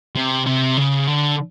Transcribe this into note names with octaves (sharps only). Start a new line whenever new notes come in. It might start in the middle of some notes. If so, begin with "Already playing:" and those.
C3
C3
C#3
D3